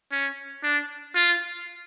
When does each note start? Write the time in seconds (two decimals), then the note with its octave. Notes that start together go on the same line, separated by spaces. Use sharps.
0.12 C#4
0.63 D4
1.15 F4